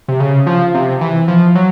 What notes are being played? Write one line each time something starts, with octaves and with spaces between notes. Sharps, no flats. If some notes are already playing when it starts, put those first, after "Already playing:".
C3
C#3
F3
C3
E3
F3
F#3